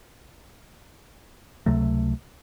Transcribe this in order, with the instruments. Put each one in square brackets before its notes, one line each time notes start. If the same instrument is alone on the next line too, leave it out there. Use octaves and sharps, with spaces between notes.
[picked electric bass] C#2 C3 F#3 A3